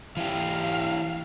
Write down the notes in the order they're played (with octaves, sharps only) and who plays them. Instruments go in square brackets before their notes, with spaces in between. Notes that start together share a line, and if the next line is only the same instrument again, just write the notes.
[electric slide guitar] E3 E4 G4 [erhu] F5